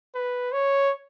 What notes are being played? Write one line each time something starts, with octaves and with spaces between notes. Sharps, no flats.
B4
C#5